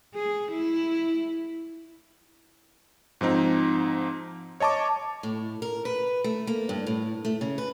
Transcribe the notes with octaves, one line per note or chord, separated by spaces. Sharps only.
G#4
E4
G#2 F3 C4 D#4
C#5 D#5 A5 C#6 D6
A2
A#4
B4
A3
A#3
G2
A2
A3
C#3
B4